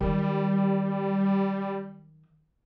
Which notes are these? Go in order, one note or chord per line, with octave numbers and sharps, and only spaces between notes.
D#3 F#3 G3